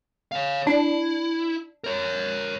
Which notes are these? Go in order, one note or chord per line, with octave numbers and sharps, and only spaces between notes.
C#5 F5
D4 E4
A#4 C#5